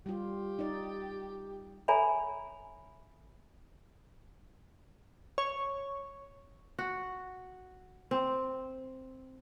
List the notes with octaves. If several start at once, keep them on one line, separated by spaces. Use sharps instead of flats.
G3 F4 G4
D#4 D5
A4 C#5 E5 G#5 A#5 B5
C#5
F#4
C4